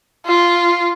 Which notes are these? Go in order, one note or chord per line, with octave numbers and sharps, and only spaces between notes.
F4